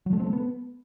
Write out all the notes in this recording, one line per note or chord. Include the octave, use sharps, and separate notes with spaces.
F#3
A3
C4
A3
B3